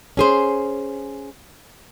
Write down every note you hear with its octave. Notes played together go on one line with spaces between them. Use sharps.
C#4 G#4 C5